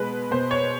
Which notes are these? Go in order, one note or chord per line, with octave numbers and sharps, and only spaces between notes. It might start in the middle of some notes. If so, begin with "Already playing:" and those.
Already playing: B2 G#3 B4
B2 C5
C#5